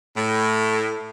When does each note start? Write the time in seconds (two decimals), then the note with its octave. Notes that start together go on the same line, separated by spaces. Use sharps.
0.16 A2